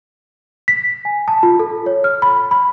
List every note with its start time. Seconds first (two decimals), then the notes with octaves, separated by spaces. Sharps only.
0.68 B6
1.05 G#5
1.28 A5
1.43 F4
1.59 A4
1.86 C#5
2.04 F6
2.22 B5
2.51 B5